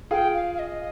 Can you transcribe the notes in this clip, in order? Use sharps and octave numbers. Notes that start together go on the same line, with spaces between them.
F4 G#4 G5
F5
F5
D#5